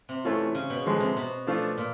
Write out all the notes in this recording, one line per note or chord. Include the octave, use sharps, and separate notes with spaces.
C3
E3 A3 C#4 F4
C#3
B2
B2 D3 F3 G#3
C3
B2
F3 A3 D4 F4
A#2